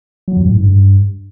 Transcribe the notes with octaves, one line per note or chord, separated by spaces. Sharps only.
F#3
F2
A2
G#2
G2